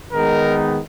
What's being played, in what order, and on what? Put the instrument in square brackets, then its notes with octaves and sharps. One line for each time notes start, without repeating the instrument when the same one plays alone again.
[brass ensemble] D#3 G#3 B3 D#4 A#4